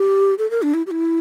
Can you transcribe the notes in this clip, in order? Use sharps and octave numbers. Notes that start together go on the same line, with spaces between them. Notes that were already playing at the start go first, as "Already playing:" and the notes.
Already playing: G4
A4
A#4
D4
E4
G4
E4